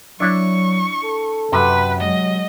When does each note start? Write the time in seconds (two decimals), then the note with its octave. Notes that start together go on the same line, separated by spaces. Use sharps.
0.20 F#3 D4 E4 C#6 E6
1.03 A4
1.52 F#2 C3 B4 E5 F#5
2.00 F#3 G#3 D#5